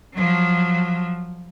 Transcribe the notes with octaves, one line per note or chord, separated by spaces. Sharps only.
F3 F#3